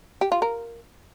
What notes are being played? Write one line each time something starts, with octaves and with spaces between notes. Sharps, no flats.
G4
F4
A#4